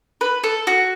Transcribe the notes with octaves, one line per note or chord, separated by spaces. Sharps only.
B4
A4
F#4